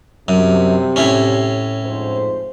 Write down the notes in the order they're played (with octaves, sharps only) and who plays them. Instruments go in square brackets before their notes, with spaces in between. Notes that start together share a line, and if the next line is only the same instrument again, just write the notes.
[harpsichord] F#2 [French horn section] C3 G3
[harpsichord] A2 C#4
[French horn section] F2 G#2 C5